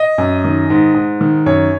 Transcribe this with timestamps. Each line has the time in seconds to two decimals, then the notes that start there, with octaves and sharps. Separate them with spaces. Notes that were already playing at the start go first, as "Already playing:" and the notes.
Already playing: D#5
0.18 F#2
0.44 D#3
0.70 G#2
0.94 G#2
1.21 D#3
1.46 F#2 C#5